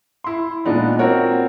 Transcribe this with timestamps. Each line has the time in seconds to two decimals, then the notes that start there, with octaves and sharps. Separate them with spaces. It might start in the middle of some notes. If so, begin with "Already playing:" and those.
0.24 E4 C6
0.65 A#2 G#3 B3 D4 D#4 F4
0.99 C4 F4 F#4 A#4 C#5